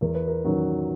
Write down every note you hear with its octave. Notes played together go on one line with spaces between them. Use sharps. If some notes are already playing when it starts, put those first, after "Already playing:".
E2 A#4
B4
A#4
D#3 F#3 C#4 F#4